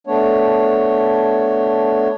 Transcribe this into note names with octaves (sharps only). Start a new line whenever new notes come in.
A3 B3 D4 C#5